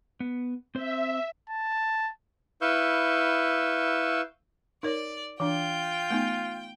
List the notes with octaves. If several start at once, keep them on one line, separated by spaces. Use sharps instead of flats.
B3
C4 C5 E5
A5
E4 B4 F5 C#6 E6 G6
D#4 A#4 C#5 D5
E3 D4 F4 G5
A3 B3 D#4